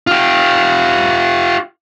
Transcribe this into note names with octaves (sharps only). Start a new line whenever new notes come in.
F4 G4